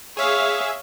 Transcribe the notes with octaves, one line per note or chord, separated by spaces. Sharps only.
G#4 C#5 E5 F5